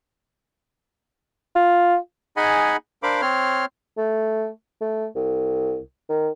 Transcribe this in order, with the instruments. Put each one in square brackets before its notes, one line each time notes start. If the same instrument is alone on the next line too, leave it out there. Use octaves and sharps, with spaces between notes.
[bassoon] F4
[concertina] D#4 G#4 D#5 F#5 G#5 B5
D4 A#4 C5 F5 B5 D6
C4 C#5 C6 F6
[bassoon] A3
A3
C2
D#3